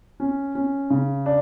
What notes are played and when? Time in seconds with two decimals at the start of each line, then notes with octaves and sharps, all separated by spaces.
0.20 C#4
0.55 C#4
0.90 C#3
1.26 D4